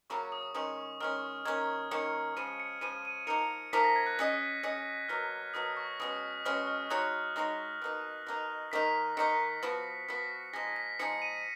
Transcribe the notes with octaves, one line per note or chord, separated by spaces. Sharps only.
C#3 F#3 A#3 C#4 C#6
D#6
D#3 G#3 C#4 D#6
D#3 G#3 C#4 F6
D#3 A#3 C#4 G#6
D#3 A#3 C#4 C#7
C#3 F3 G#3 D#7
C#7
C#3 F3 G#3 D#7
D#7
F3 A#3 D#4 A#4 C#7
F3 A#3 D#4 A#4 B6
A#6
G#6
F#6
C#4 G#4 D#5
C#4 G#4 D#5
B2 F#3 A#3 F6
B2 F#3 A#3 D#6
C#6
B2 G#3 C#4 D#6
B2 G#3 C#4 F6
F6
G#3 D#4 F#4 C#5 F#6
G#3 D#4 F#4 C#5 A#6
B2 A#3 D#4
B2 A#3 D#4
D#3 A#3 D#4 B6
D#3 A#3 D#4 C#7
F3 B3 F#4
F3 B3 F#4 B6
F3 G#3 D#4 G#4 A#6
B6
F3 G#3 D#4 G#4 C#7
D#7